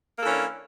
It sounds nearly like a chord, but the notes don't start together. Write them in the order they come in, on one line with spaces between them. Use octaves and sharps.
A#3 A4 E3 C#4 D4